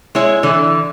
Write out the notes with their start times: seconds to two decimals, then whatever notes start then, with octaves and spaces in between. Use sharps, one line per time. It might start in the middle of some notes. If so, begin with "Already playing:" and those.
0.15 G#3 E4 C#5
0.43 D3 E3